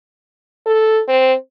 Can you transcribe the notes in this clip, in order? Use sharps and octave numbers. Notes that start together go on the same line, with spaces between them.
A4
C4